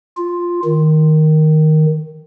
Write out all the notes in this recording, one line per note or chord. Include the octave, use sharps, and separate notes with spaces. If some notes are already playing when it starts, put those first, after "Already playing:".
F4
D#3